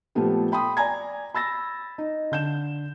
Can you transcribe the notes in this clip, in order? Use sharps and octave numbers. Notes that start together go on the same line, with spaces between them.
A#2 F3 A3 B3 G4
G5 B5 C6 D#6
D5 G#5 A#5 G#6
B5 E6 A6 A#6
D#4
D3 G6 E7